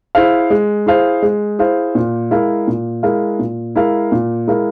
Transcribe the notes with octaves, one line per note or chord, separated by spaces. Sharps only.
E4 G#4 C5 F5
G#3
E4 G#4 C5 F5
G#3
E4 G#4 C5 F5
A#2
G#3 E4 A#4 F5
A#2
G#3 E4 A#4 F5
A#2
G#3 E4 A#4 F5
A#2
G#3 E4 A#4 F5